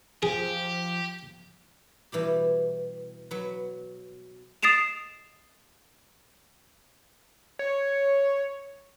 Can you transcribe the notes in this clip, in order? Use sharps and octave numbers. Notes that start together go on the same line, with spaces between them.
F3 G4 G#4
B2 E3 G3 G4
F#3 B4
D#6 A6 C7 D7 E7 F7
C#5